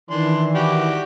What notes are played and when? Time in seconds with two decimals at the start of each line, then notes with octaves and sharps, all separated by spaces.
0.11 D#3 E3 D4 C6
0.55 F#4 G4 D5